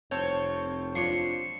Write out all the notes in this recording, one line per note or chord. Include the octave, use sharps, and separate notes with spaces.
F1 C2 C4 C#5 A5 G6
F3 D4 C#5 C7 C#7